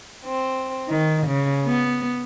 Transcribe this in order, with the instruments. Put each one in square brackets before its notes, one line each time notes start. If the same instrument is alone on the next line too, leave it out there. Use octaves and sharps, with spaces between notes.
[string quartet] C4
D#3
C#3
B3